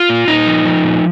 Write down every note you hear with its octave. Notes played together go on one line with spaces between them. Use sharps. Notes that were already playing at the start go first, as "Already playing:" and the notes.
Already playing: F4
A#2
A#2 D#4
F3
F3
A#2